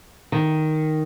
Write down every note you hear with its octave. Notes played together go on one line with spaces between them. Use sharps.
D#3